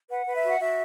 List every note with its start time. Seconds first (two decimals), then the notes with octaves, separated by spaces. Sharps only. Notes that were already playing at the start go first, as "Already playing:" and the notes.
0.10 B4 F#5
0.26 B4
0.35 E5
0.44 F#4
0.50 F#5
0.60 F#4 E5